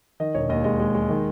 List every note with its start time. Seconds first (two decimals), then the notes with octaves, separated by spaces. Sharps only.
0.20 D#3 D#5
0.34 E1 C#5
0.49 D#2 D#5
0.64 G#3 D#5
0.80 G#3
0.94 G#3
1.10 D#3